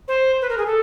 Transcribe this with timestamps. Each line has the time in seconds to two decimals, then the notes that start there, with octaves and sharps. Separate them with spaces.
0.08 C5
0.41 B4
0.49 A#4
0.58 G#4
0.66 A4